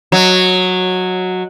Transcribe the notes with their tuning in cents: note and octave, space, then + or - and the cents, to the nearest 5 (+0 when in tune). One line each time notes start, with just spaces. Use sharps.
F#3 -10 D#5 +0